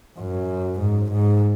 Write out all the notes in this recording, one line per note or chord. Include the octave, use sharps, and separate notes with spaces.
F#2
G#2
G#2